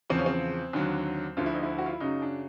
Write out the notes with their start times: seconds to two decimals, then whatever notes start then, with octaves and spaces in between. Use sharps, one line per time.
0.10 E2 C#3 F3 C4
0.18 C#4
0.26 C4
0.73 D#2 D3 F#3
1.37 D2 D3 F3 F4
1.46 E4
1.54 D#4
1.63 E4
1.78 F#4
1.86 F4
1.93 E4
2.00 F#2 C#3 F#3 D#4
2.22 D4